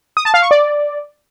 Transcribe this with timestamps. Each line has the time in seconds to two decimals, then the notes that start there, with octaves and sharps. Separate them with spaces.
0.17 D#6
0.25 A5
0.34 F5
0.42 C#6
0.51 D5